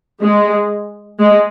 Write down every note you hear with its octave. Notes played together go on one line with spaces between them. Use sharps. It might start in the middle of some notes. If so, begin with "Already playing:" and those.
G#3
G#3